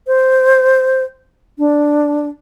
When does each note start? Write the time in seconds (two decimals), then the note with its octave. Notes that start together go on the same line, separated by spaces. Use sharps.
0.07 C5
1.58 D4